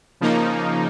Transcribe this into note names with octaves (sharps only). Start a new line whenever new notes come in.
C#3 F3 A#3 D#4